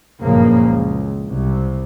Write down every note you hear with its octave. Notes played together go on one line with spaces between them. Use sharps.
F#1 G2 A#2 C#3 F3 A#3
C#2
C2 C3